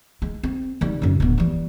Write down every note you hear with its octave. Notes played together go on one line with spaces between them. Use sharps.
G#3
C4
D#3 G3
F#2 C#3
D1 B3
E3 G3